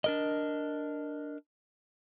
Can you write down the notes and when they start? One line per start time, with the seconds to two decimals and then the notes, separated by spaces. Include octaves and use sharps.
0.04 D4 A#4 D#5